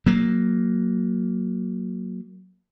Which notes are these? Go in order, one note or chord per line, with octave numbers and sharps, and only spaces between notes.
F#3 A#3